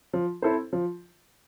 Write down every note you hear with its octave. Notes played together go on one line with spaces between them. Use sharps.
F3
C4 E4 A4 C5
F3